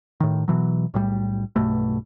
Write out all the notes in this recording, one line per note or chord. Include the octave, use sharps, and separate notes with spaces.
A2 D#3
B2 E3 F#3
B1 A2 G3
B1 G2 B2 A3